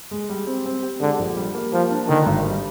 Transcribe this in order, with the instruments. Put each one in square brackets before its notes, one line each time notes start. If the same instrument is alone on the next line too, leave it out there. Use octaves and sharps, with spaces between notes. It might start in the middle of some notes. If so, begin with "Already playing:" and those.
[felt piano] G#3
G3
C4
C4
G4
[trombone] D3 [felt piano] G#3
[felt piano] A#1
G3
A#3
[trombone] F3 [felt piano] A#3
[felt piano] D4
[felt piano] D3 [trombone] D#3
[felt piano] G#1
G3